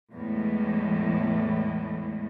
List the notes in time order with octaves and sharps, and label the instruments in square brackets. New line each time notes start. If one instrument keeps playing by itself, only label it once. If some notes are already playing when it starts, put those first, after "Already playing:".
[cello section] E2 A2 G#3